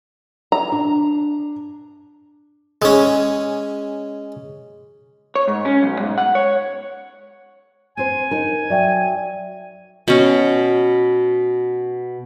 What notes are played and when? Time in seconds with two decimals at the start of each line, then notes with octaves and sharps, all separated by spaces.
0.52 A#5
0.72 D4
2.82 G#3 C#4
5.36 C#5
5.48 G#2
5.65 C#4
5.83 B1
6.00 G#2
6.18 F#5
6.35 C#5
7.97 C4 C5 G#5
8.31 D#4 A#4
8.70 F#3 D5 E5 G5
10.08 B2 C#4